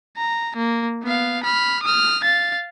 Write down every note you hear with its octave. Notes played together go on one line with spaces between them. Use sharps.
A#5
A#3
B3 F5
B5 F6
D#6 F6
F5 A6